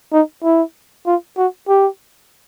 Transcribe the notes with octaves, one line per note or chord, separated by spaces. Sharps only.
D#4
E4
F4
F#4
G4